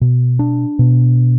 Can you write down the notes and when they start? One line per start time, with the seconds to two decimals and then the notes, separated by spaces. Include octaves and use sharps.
0.01 B2
0.39 D4
0.79 B2